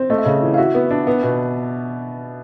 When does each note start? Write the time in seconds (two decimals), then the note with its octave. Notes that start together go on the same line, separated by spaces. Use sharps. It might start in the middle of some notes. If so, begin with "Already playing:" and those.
Already playing: C4
0.10 A3 D#5
0.18 E5
0.25 C#3 D#5
0.42 E3
0.54 F5
0.58 F#4 E5
0.75 B3
0.91 D4
1.07 B3
1.23 B2